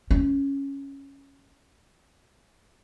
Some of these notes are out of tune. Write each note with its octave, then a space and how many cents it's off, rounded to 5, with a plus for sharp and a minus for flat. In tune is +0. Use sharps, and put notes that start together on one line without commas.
C#4 -5